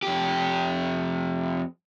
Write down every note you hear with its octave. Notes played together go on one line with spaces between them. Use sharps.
F2 G4